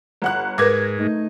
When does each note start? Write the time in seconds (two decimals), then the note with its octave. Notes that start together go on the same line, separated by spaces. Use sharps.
0.22 G1 F#5 F#6
0.58 G#2 A#4 B4 D6 G#6 A#6
0.97 A3 D#4